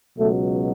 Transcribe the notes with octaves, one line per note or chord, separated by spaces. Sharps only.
C#2 B2 F#3 A3